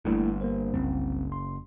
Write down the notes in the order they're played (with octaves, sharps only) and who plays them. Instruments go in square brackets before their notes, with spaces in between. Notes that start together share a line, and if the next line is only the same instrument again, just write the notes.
[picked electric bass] G1 G2 [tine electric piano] A3 A#3 E4
[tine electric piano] A#3 A#4 C5
[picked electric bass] F#1 [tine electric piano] C2 G3 C4
[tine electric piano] C6